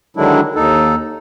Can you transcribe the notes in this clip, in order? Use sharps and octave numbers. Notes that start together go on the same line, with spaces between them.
D3 D#3 F#3 G#3 D4 E4
D#2 D#4 A4